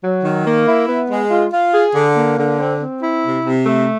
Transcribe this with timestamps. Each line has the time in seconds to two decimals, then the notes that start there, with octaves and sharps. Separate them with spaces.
0.03 F#3
0.24 D#3
0.46 A#3
0.67 E4
0.88 B3
1.10 G#3
1.31 F4
1.52 F4
1.74 G#4
1.94 D3
2.16 A#3
2.38 D3
2.59 C4
2.80 C4
3.02 E4
3.23 C3
3.44 C3
3.65 A3